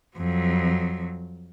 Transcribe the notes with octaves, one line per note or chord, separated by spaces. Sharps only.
F2 F#3